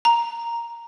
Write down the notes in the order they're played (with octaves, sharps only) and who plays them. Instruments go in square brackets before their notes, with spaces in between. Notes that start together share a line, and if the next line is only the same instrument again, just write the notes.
[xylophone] A#5